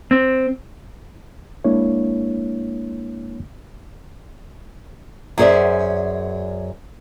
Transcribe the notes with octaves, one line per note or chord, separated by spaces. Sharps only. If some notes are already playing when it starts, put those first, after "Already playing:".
C4
G#3 A#3 D4 E4 C#5
F#2 C#4 G#4 C5 D5 E5